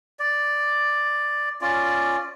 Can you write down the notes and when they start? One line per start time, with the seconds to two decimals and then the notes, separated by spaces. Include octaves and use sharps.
0.19 D5
1.61 C#4 F4 D5